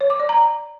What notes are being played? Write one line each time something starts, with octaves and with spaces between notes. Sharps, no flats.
C#5
D6
D5
A#5